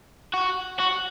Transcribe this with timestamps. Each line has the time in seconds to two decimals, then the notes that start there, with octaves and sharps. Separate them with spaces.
0.34 F#4
0.80 F#4